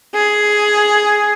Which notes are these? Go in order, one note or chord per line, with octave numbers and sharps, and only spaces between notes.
G#4